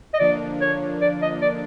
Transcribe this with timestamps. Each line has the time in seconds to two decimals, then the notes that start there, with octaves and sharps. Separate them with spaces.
0.14 D#5
0.19 D3 F3 A#3 D4 D5
0.61 C#5
1.01 D5
1.22 D#5
1.42 D5